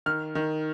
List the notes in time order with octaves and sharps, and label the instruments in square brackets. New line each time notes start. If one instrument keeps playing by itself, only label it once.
[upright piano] D#3 F6
D#3